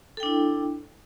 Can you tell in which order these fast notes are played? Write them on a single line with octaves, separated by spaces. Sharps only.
A4 G5 D4 E4